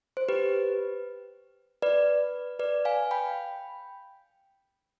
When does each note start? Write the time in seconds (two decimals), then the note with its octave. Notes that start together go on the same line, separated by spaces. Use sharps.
0.17 C5
0.29 G4 B4
1.82 B4 D5
2.59 B4 D5
2.85 F5 G#5
3.11 G5 B5